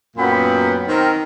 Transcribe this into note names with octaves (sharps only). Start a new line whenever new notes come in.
F#2 A#2 F#3 B3 G5 B5
D#3 C4 A#4